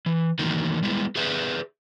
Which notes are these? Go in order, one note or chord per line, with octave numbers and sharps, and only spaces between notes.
E3
D#3 E3 F#3 A3 A#3 D#4
G3 G#3 B3 E4
G4 G#4 B4 E5